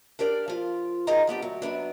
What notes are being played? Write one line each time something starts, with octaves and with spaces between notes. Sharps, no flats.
D4 G4 A#4 D5
F3 F4
D#4 F4 G#4 A#4 D#5 A#5
F3 B3 D4 G4
D2 F#3
F#2 F#3 B3 D4